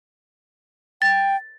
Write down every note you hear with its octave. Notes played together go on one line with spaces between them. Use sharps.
G5 A6